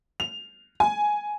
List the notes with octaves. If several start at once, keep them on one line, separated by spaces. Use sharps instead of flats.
F7
G#5